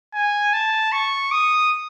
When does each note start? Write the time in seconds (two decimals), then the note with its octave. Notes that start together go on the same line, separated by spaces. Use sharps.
0.14 G#5
0.53 A5
0.92 C#6
1.31 D#6